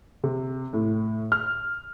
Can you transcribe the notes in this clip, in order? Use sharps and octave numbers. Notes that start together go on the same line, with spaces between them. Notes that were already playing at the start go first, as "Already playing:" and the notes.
C3
A2
F6